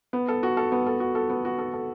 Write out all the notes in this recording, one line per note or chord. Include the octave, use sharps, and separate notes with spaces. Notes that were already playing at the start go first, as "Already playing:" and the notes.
B3
A4
F#4
A4
B3
A4
F#4
A4
B3
F#4
A4
A4